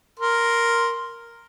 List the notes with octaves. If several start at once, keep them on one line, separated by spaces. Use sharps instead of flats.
A#4 C6